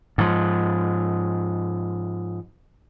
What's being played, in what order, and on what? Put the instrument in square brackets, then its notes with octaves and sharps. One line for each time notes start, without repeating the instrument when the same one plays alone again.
[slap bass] G#2 F3